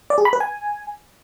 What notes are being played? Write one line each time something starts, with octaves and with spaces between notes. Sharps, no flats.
D5
G#4
B5
B4
G#5